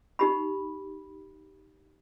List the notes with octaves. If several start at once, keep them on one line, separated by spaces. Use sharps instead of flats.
D#4 G4 B5